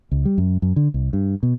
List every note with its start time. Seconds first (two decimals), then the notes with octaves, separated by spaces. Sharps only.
0.11 C#2
0.25 G3
0.38 F#2
0.62 F#2
0.76 D3
0.94 C2
1.13 G2
1.43 B2